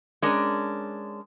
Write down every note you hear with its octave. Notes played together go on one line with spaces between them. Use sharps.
G#3 C#4 D4 A#4